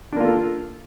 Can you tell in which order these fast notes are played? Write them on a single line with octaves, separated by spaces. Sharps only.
D4 A#3 F4 A4